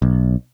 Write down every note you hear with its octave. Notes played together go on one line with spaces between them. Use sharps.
B1